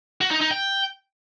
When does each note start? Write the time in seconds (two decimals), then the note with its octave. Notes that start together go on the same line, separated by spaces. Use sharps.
0.21 F#4
0.31 D#4
0.41 D#4
0.51 G5